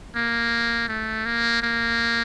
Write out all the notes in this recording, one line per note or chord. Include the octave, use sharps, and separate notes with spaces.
A#3
A3
A#3
A#3